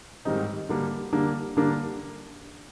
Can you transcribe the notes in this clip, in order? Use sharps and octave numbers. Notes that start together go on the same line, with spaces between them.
G#2 D#3 G3 C4 D#4
D3 G3 A#3 D4
D3 G3 A#3 D4
D3 G3 A#3 D4